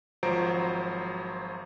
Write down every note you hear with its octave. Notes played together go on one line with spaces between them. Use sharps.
G#1 F3 F#3 C5 A#5 D7